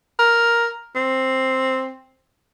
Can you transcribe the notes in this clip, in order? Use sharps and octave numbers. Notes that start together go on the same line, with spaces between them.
A#4
C4